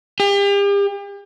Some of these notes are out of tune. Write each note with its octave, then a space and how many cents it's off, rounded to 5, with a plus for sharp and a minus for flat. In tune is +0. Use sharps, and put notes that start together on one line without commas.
G4 +40